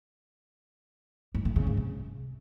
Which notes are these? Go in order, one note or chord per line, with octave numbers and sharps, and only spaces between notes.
G#2
A2
C#3
G#2
C3